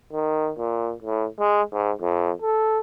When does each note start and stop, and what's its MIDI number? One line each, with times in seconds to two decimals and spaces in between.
0.13 0.51 51
0.58 0.93 46
1.02 1.26 45
1.39 1.62 56
1.72 1.91 44
2.01 2.31 41
2.42 2.80 69